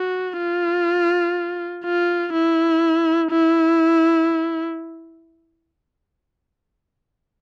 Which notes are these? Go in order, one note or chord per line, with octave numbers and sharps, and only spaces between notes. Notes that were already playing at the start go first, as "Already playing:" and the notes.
Already playing: F#4
F4
F4
E4
E4